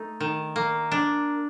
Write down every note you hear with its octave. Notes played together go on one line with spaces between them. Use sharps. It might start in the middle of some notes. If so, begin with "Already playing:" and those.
Already playing: A3 D#4
D#3
A#3
D4